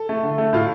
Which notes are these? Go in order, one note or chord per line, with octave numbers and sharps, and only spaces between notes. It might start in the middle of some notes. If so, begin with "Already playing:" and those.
Already playing: A4
A3
D3
A3
A2 F4